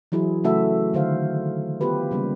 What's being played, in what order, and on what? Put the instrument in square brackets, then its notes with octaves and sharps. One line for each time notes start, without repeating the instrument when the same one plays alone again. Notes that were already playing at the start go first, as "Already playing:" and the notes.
[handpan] E3 F#3 E4 G#4
C#3 F#3 A3 F#4 A4 E5
D3 D#3 C5 F5
B3 F4 G4 B4
C#3 G3 A#3